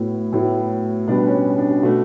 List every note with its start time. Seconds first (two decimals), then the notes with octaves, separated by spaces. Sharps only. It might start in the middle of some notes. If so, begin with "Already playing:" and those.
Already playing: A2 F#3 B3 E4
0.33 A2 F#3 B3 E4
1.08 B2 G3 B3 D4
1.26 C#4
1.58 D4
1.70 F#4
1.83 B2 A3 F#4